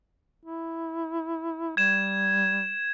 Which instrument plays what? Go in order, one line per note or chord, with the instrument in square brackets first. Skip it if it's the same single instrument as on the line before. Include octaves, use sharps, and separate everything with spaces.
[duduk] E4
[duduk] G3 [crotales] G#6 E7